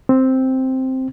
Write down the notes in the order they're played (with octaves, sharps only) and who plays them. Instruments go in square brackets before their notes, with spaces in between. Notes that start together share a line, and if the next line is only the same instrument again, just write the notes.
[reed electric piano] C4